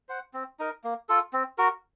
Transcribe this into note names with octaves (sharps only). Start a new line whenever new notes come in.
C5 F#5
C4
D#4 A#4
A#3
F4 A4
C4
F#4 A#4